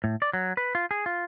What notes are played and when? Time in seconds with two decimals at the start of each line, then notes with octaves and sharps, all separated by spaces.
0.04 A2
0.22 D5
0.33 F#3
0.57 B4
0.75 F4
0.91 G#4
1.06 F4